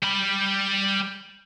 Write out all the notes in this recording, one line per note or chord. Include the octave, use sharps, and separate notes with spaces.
G3 B5